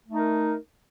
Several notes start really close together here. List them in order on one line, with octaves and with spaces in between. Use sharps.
A3 D#4 A#4